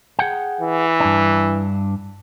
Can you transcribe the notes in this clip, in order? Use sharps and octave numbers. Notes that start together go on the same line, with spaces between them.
G#4 F#5 G5
E3
G2 D4